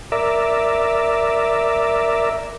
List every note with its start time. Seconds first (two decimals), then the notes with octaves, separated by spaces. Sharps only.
0.12 A#4 D5 E5